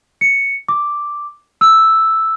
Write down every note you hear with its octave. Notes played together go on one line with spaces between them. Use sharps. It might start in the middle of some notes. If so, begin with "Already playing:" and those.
C#7
D6
E6